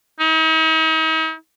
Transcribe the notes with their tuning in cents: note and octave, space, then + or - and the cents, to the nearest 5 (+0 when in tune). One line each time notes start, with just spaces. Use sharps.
D#4 +45